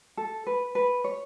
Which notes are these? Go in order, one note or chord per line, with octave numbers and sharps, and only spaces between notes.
A4
B4
B4
C#5